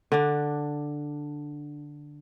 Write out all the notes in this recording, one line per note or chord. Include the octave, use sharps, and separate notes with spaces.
D3 D4